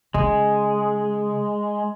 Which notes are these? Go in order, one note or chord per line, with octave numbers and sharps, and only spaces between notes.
C#3 G#3